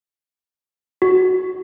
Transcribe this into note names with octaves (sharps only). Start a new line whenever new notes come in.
F#4